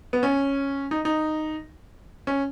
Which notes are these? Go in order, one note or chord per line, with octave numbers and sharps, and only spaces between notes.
B3
C#4
D#4
D#4
C#4